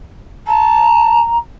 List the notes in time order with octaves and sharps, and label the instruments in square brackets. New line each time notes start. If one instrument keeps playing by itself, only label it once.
[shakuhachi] A5 [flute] A#5